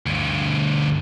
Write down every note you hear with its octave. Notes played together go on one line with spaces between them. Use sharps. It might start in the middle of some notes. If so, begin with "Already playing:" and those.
D2 G2